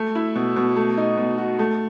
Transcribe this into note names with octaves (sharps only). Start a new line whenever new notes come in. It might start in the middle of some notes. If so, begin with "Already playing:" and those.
Already playing: A3
E4
B2
B2
A3
D#4
B2
F#4
A3